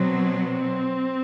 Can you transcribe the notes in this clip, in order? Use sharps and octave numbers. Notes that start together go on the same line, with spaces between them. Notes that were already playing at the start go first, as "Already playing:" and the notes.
Already playing: B2 F#3 B3 C4
C4